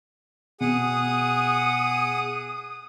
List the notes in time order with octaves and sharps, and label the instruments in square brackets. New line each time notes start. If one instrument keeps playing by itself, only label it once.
[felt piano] B2 [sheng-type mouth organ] G#4 F#5 [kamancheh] D#6